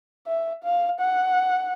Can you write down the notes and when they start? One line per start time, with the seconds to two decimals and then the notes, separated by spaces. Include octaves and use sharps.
0.27 E5
0.64 F5
1.00 F#5